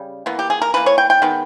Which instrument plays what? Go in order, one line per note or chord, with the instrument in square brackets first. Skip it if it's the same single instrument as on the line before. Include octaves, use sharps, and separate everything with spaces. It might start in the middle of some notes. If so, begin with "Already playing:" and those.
Already playing: [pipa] C#3 G3
E3 A#3 B3
G4
G#4
A#4
E3 A#3 B4
C#5
G5
G5
D#3 G#3 B3